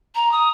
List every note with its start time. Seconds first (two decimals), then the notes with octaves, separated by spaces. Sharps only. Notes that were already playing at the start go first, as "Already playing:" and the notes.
0.15 A#5
0.31 D#6